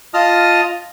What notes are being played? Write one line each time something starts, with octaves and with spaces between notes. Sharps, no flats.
F4 D#5 A5 D#6 F6